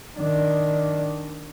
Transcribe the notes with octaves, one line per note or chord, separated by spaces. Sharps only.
D#3 D4